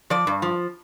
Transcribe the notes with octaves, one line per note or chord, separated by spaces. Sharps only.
F3 D5
G2
F3